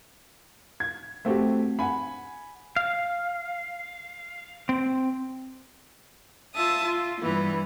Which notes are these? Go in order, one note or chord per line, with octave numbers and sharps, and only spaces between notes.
G#6
A3 C4 F#4 G4
F#5 G#5 B5
F5
C4
F4 E5 A5 D#6
F4
G2 E3 B3